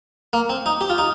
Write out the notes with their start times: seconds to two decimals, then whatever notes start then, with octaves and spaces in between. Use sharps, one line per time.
0.33 A#3
0.49 C4
0.66 D#4
0.81 G4
0.90 F4
0.98 D#4